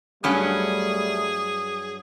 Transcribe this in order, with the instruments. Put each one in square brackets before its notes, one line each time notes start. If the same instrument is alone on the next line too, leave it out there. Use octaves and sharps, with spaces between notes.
[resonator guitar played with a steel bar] G2 F#3 C#4 [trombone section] G3 A3 [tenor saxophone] G#4